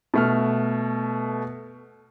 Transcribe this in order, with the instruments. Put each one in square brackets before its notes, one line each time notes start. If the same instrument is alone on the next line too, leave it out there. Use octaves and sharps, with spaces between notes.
[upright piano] B2 A3 F6